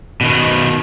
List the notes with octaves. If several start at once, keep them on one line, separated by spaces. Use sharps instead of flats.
B2 D#3